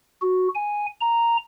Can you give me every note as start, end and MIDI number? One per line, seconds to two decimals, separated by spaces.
0.22 0.48 66
0.55 0.86 80
1.01 1.37 82